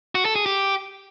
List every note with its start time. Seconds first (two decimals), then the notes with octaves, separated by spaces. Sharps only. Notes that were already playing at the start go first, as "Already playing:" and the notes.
0.15 F#4
0.25 A4
0.36 G#4
0.46 G4